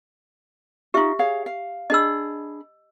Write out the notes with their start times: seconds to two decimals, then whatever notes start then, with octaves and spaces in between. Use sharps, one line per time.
0.94 D#4 F4 G4 E5
1.19 G#4 C#5 F5
1.46 F5
1.90 D4 G#4 D#5 B5 E6